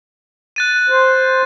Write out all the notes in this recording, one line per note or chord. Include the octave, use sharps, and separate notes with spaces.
F#6 A6 D#7
C5